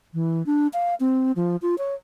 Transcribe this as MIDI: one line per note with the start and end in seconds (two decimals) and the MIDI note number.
0.14 0.45 52
0.46 0.67 62
0.73 0.94 77
1.00 1.32 60
1.36 1.56 53
1.62 1.75 65
1.78 1.94 73